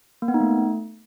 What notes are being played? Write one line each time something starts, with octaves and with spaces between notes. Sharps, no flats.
A#3
B3
D#4
A3